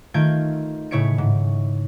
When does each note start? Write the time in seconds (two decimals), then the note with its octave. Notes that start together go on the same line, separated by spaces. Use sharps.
0.14 D#3 A3 F4 G6 G#6 D7
0.91 A2 C#3 E4 C#5 C#7 D7
1.18 G#2